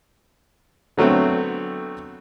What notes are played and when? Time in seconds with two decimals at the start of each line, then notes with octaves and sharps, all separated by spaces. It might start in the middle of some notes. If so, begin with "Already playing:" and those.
0.97 D3 F#3 A3 B3 C4